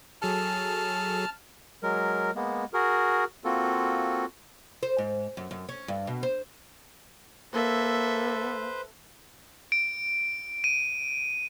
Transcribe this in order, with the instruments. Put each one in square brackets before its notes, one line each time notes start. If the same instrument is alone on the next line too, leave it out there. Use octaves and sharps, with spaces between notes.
[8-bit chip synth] F#3 G#4 A4 [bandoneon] A5 F6
[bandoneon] F#3 G#3 A#4
G#3 A#3 B3
F#4 G#4 A#4
A#3 C4 F4 F#4 A4
[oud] C5
G#2
F#2
F#2
C#4
G2
B2
C5
[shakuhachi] A#3 [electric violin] A4 E5 [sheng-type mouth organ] B4 C5
[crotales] D7
D#7